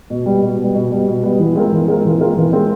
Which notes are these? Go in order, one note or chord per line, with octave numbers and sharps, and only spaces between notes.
B2
G3 B3
B2
G3 B3
B2
G3 B3
B2
G3 B3
E3
G#3 C4 F4 A#4
E3
G#3 C4 F4 A#4
E3
G#3 C4 F4 A#4
E3
G#3 C4 F4 A#4